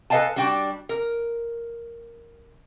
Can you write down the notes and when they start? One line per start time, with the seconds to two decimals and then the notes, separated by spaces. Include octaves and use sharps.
0.10 A4 B4 D#5 F5 G#5 A5
0.36 G3 D4 F#4 G5
0.89 A#4